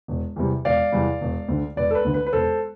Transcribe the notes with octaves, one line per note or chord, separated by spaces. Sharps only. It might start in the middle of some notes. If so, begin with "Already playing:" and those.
E1
E2 C3 G3
E1 D5 F5
E2 C3 G3
E1
D2 D3
E1 B4 D5
A4
B4
D2 D3
B4
B4
E1 A4 C5